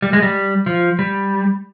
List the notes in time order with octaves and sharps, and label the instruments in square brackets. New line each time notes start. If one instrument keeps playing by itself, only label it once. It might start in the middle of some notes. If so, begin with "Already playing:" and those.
[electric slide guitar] G3
G#3
G3
F3
G3